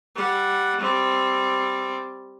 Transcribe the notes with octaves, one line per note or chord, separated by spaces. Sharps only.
G3 F#5
G3 C4